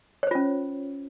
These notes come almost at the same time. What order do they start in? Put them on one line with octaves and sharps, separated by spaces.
C#5 C5 F4 C#4